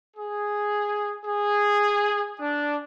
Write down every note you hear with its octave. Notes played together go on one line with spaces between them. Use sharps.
G#4
G#4
D4